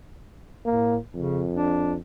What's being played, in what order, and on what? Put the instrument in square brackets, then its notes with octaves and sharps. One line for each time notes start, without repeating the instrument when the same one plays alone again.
[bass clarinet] A2 [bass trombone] A#3
[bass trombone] F2 [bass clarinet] C#3
[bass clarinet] D4